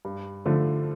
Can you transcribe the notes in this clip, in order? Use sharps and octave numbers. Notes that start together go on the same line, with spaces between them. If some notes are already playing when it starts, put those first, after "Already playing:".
G2
D3 F3 A3